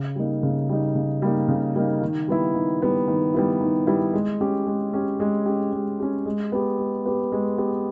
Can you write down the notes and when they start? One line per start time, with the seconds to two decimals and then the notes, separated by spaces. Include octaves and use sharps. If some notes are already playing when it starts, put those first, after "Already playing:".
Already playing: C#3
0.15 G3 A#3 D#4
0.43 C#3
0.69 G3 A#3 D#4
0.95 C#3
1.22 G3 A#3 D#4
1.48 C#3
1.75 G3 A#3 D#4
2.02 D#3
2.28 G3 B3 E4
2.54 D#3
2.82 G3 B3 E4
3.08 D#3
3.34 G3 B3 E4
3.61 D#3
3.87 G3 B3 E4
4.14 G#3
4.41 C#4 G4
4.67 G#3
4.93 C#4 G4
5.20 G#3
5.46 C#4 G4
5.73 G#3
6.00 C#4 G4
6.26 G#3
6.52 B3 G4
6.79 G#3
7.06 B3 G4
7.32 G#3
7.58 B3 G4